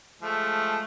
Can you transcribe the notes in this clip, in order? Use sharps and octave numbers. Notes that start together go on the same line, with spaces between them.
F3 G#3 A3